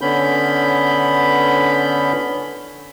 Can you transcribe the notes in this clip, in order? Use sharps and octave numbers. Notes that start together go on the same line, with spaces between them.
D3 B3 C#4 B5 G6